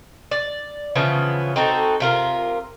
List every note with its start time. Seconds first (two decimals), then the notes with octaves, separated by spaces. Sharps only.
0.31 D5
0.96 C#3 E3 F3 B3
1.56 C4 D#4 F#4 A4
2.00 C3 F4 A#4